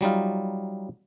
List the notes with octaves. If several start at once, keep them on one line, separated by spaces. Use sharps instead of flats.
F#3 G3 D#4 F4